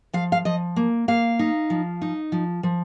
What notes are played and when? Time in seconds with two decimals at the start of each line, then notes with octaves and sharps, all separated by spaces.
0.13 F3 F5
0.32 F5
0.45 F3 D#5
0.76 A#3
1.08 A#3 F5
1.39 D#4
1.70 F3
2.02 D#4
2.32 F3
2.63 F3